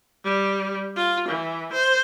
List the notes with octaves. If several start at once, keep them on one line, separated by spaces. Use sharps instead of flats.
G3
F4
E3
C5